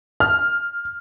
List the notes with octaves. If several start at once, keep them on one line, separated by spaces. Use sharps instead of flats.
F6